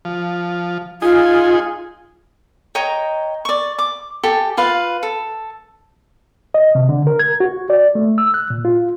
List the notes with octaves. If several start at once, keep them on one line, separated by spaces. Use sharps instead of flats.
F3
D#4 F4 G#4
C#5 D#5 G5 A#5
D5 C#6
D6
G4 A4 G5 G#5
F4 B4 F5
A4
D#5
C3
D3
A#4
G#6
F#4
D5
A3
E6
F#6
A#2
F4